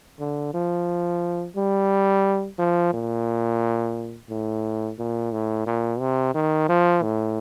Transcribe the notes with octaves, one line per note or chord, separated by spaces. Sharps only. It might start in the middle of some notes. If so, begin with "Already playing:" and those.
D3
F3
G3
F3
A#2
A2
A#2
A2
A#2
C3
D#3
F3
A2